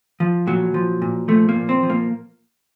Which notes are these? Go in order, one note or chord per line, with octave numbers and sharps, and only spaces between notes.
F3
A#2 F#3
F3
A#2
F3 A3
A#3
A#2
C4
F3
A#3